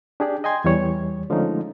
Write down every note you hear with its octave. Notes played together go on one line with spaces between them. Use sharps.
D4 G4 G#4 D5
D#5 G5 G#5 C6 G#6
E2 E3 G3 C#5
D3 F3 G#3 A3 C#4 D#4